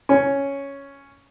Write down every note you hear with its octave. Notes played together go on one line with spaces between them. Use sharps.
C#4